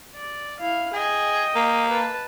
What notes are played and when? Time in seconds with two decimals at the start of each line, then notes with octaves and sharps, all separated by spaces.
0.15 D5
0.59 E4 F5
0.93 G#4 D#5 G5
1.55 A#3
1.89 B4 A5